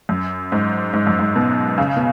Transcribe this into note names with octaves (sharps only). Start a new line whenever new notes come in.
F#2
G#2
G#2
F#2
G#2
B2
C#3
B2